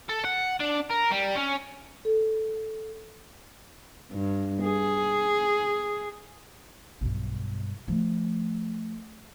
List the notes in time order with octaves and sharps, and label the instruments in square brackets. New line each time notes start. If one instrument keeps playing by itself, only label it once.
[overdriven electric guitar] A4
F#5
D4
A#4
G3
C#4
[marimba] A4
[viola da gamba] G2
G#4
[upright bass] B1 G2
F3 A3